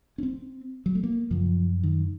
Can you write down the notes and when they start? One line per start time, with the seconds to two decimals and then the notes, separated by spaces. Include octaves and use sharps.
0.18 C#4
0.23 C4
0.86 F#3
0.95 A3
1.03 A#3
1.30 F#2 C#3 F3
1.83 D#3